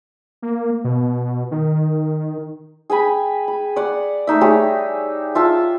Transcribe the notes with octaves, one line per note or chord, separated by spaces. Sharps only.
A#3
B2
D#3
G#4 G5 G#5 B5
B5
D5 F#5
A3 D#4 E5
G3 G4 G#4 C#5
F4 E5 A5